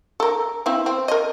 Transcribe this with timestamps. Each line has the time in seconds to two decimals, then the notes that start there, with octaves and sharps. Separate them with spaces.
0.20 A4 A#4
0.66 C4 E4 F5
0.86 C4
1.08 A#4 D#5